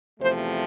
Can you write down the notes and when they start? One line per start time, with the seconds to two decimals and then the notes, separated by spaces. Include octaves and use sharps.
0.20 E2 C3 F3 A3 C5